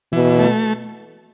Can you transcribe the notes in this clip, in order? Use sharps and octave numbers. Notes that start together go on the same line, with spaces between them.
B2 E3
A3